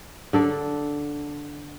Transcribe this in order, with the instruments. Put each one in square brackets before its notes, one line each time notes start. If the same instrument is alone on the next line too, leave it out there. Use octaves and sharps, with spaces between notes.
[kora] D3 A4 D5